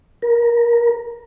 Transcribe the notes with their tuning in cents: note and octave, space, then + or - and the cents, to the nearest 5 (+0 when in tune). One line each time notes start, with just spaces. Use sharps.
A#4 +20